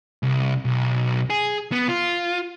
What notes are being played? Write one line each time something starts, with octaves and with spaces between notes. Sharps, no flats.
C2
B1
G#4
B3
F4